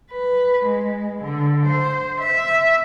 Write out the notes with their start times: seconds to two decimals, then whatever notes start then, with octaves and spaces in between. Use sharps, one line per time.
0.11 B4
0.63 G#3
1.19 D3
1.66 C5
2.21 E5